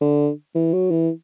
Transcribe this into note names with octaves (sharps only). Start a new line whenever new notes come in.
D3
E3
F#3
E3